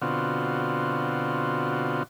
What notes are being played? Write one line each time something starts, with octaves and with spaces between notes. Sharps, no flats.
B2 D3 C4 F4 F#4